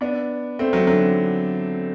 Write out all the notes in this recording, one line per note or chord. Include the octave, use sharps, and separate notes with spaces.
B3 D4
A3 C4
F#3 A3
D3 F#3